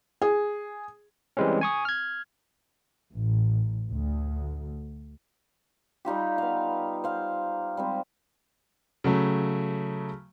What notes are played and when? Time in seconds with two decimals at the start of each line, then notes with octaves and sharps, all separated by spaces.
0.22 G#4
1.37 E3 G3 G#3 C4 C#4
1.61 G#5 C#6 D#6
1.85 F6 G#6
3.12 A1
3.91 D2
6.05 G3 D#4 F4 G4
6.38 B3 F5
7.04 C5 F5 A#5
7.77 G3 G#3 C4
9.04 C#3 F#3 A3